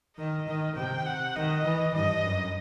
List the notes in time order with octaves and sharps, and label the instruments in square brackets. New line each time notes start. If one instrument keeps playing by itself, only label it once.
[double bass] D#3 [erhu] D#5
[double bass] D#3
[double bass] C3 [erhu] G5
[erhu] F#5
[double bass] D#3 [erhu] D#5
[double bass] E3
[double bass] G2 [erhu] D#5
[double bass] F#2